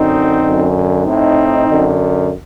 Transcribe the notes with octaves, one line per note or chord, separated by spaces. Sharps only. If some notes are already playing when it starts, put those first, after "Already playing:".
Already playing: F#2 D3 C4 D#4
F#2 D3
A2 C4 D#4
F#2 D3